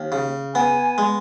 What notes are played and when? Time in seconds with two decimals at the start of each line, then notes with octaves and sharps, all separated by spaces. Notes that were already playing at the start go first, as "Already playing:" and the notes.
Already playing: D#2
0.12 C#3
0.55 B3 G#5
0.98 G#3